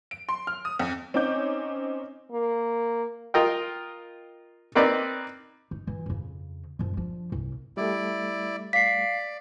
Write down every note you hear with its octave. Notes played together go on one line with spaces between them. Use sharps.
D7
C6
F6
D#6
F2
C4 C#4 D#4 C#5 D6 G6
A#3
F4 A#4 D#5 G5
A#3 C4 D#4 B4 D5
D#4
E3
F2 C#3
F#2 F3
F3 D4
C2
G3 A3 E4 D5
D5 F5 B6 C7